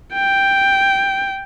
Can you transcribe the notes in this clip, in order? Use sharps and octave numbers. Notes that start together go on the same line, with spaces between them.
G5